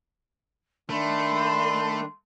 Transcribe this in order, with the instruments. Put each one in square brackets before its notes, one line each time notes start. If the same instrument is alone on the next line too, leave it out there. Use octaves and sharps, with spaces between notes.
[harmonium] D#3 D4 [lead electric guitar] A3 [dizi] B5 [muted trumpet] C6